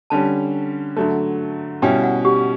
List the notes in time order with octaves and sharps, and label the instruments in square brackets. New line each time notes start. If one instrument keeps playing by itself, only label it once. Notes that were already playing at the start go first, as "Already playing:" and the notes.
[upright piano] D3 G3 C#4 [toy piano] A5
[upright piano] D3 F#3 A3
[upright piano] B2 G3 C#4 E4 [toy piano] G5
[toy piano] F#5
G4